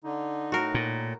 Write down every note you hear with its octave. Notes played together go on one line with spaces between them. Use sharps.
D3 D#4
A2 F#4 A#4
A#2